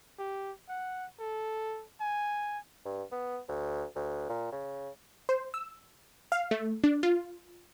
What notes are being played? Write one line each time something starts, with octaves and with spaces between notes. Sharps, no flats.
G4
F#5
A4
G#5
G2
B3
D2
D2
A#2
C#3
C5
E6
F5
A3
D4
F4